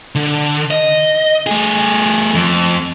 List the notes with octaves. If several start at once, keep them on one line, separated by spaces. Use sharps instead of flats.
D3
D#5
A3 G#4
F2